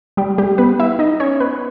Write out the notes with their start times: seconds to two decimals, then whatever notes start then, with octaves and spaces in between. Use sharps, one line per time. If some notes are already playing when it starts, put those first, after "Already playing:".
0.17 G3 G4
0.38 G3 G4
0.58 B3 B4
0.80 E4 E5
0.99 D#4 D#5
1.20 C#4 C#5
1.40 B3 B4